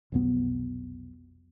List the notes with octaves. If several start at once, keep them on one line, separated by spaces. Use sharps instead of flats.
F1 B1 B3